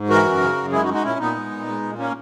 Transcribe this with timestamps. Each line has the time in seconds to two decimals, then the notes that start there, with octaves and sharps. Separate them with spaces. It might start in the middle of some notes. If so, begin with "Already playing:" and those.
Already playing: G#2
0.09 E3 F#4 A#4
0.25 F#2
0.41 C#3
0.57 F#2
0.72 G#3 E4 G#4
0.83 D#4 F#4
0.88 G#3
0.93 D#4 F#4
1.04 A#2 C#4 E4
1.19 A#2 B3 D#4
1.35 G#3
1.51 A#2
1.67 G#3
1.83 A#2
1.98 A#3 C#4